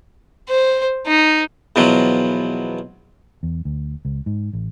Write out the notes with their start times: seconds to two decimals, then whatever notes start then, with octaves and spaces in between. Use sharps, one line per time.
0.49 C5
1.07 D#4
1.76 E2 B2 F3 F#3
3.43 E2
3.65 D2
4.05 C#2
4.26 G#2
4.53 A1